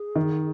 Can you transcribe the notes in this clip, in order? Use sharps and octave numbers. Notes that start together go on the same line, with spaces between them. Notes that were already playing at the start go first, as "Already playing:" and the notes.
Already playing: G#4
D#3